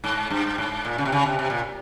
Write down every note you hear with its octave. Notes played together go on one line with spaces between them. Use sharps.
G#2
G2
G#2
A#2
C#3
C3
C#3
C3
C3
A#2